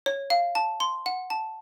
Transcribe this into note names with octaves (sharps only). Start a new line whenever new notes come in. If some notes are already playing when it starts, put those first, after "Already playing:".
C#5
F5
A5
C6
F#5
A5